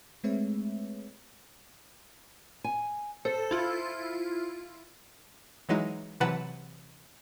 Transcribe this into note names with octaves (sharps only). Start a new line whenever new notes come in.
G#3 A3 C4 B4 C#5 E5
G#5
A4 C5
E4 F4
E3 F#3 G#3 D#4 E4
C3 E3 F#3 B4 F#5 A5